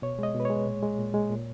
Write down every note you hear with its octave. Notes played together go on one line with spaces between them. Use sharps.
B2 C#5
G#3 D#5
B2
B4
G#3 C#5
A#2
G#3
A#2
G#3
A#2